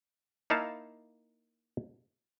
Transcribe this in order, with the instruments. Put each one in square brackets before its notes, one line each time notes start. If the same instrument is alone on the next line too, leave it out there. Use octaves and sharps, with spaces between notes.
[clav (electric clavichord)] A#3 D#4 E4 F5 A5